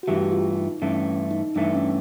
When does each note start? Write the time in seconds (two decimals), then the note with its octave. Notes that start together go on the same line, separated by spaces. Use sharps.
0.03 F#4
0.07 G2 E3 A3 G4
0.32 F4
0.57 D#4
0.82 G2 E3 A3 C#4
1.31 D#4
1.55 G2 E3 A3 D4
1.75 C#4